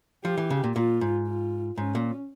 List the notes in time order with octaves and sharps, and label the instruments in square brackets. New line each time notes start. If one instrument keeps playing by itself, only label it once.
[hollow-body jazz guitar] F3 [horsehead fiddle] G4
[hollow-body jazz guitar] E3
C#3
A#2
[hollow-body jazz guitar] A#2 [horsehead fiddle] F4
[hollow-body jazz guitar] G#2
[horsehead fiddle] F4
[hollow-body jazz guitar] G#2 [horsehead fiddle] C#4
[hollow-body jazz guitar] A#2